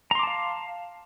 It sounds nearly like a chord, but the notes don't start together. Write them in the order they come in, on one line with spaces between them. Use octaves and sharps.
A#5 C6 D6 A5 F5